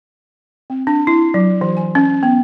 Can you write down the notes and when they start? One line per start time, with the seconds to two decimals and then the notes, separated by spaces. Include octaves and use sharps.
0.70 C4
0.87 D4
1.07 E4
1.34 F#3
1.61 E3
1.77 G#5
1.95 C#4
2.23 B3